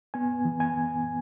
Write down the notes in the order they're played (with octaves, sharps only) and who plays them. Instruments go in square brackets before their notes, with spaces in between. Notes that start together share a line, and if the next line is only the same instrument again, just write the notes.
[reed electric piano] B3 G#5
E3
G#5